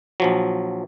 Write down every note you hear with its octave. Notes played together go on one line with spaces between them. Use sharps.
A#1 F3 F#3